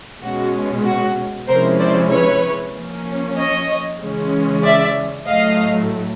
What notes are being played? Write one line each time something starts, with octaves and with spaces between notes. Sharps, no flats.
B2 G#3 C#4 F#4
F#4
C3 F3 G#3 C#4 E4 A#4 C5
C5 D5
B4 C#5
F3 A#3 C#4
C#5 D#5
C#3 E3 G#3 C#4
D5 E5
A2 F#3 A3 D#5 F5